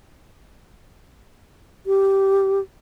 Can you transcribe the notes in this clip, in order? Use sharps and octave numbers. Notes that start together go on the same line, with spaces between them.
G4